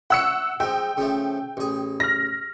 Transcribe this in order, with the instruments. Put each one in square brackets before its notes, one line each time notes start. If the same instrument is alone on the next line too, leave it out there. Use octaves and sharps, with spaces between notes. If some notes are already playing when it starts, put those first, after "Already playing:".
[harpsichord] C#5 E5 [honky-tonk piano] F#5 E6 C#7
[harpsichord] F3 G#3 [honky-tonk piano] G5
[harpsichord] C#3 F3 A3
A1 G#4
[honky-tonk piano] F6 A#6